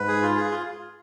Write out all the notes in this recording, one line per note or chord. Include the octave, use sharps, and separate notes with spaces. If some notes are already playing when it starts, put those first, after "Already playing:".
Already playing: G#2 B4
G#4
F4
G#4
F4